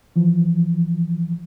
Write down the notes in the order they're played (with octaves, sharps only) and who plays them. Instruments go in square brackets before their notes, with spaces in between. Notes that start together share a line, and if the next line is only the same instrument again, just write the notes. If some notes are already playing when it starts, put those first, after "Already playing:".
[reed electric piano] E3 F3